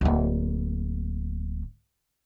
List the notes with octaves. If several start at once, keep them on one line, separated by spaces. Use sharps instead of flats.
D1 A#3